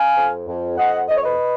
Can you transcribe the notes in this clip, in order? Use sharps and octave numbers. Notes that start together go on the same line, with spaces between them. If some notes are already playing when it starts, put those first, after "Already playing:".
Already playing: F5 G#5
F2
F2
F2 D#5 F#5
F2 D#5
C#5
B4 D#5